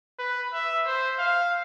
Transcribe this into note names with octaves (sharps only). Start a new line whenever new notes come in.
B4
E5
C5
F5